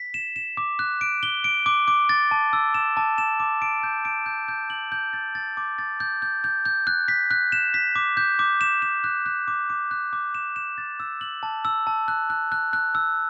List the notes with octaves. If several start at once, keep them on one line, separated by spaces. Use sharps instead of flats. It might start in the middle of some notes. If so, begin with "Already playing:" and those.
Already playing: B6
E7
E7
D6
F#6
D7
G7
D7
D6
D6
A6
A5
E6
E7
A5
E7
D6
D7
G6
D7
G6
G6
F#7
G6
A6
A6
D6
A6
G6
G6
G6
G6
F#6
B6
F#6
E7
B6
D6
G6
D6
E7
E7
F#6
F#6
D6
D6
F#6
D6
E7
E7
A6
E6
F#7
A5
E6
A5
F#6
F#6
F#6
F#6
E6